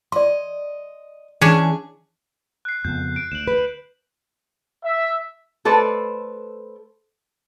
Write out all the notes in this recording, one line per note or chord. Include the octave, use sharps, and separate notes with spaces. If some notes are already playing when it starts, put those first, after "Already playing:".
D5 D#5 C6
E3 C#4 D4 G#4
F#6 C7
F2 C#3 B3 G6
D7
D2 E7 F#7
B4
E5
A3 A4 B4 C5 D5